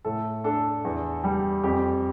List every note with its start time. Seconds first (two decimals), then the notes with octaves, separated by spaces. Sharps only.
0.05 A2 A4
0.44 D4 A4
0.85 E2
1.24 G3
1.63 F2 G4